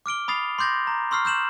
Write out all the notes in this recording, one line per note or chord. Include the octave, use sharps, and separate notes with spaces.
D6 F6 D7 G7
B5 D#6 A6 C7 F7
C6 D6 G6 A6 A#6
A#5
C6 C#6 E6 F6 C7
E6 G6 E7 F#7